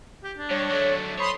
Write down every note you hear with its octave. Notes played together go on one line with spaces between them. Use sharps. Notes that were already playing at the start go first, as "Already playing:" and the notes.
G4
D4
G2 C#5
F#3 A3
C5 C#5 B5 C6 D#6